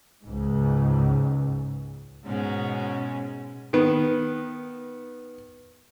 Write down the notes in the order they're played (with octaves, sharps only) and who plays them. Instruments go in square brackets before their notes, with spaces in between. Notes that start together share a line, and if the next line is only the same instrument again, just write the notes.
[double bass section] C#2 G#2
[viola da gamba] G#2 B2 C#4
[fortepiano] D#3 B3